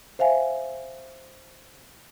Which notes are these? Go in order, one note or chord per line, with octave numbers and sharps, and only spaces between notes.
C5 E5 F5 G#5